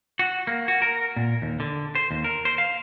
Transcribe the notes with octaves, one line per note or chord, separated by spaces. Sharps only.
F#4
A#3
F#4
A#4
A#2
D#2
D3
C5
D#2
A#4
C5
F5